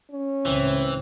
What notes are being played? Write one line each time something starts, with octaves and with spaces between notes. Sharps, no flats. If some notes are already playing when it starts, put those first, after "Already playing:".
C#4
C#2 A2 C#3 E3 C4